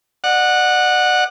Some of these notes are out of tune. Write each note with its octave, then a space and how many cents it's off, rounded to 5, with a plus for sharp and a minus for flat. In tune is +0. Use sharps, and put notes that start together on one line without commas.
D5 +40 F#5 -10